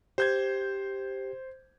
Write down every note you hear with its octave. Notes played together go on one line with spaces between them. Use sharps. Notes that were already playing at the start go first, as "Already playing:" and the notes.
G4 C5 G6 G#6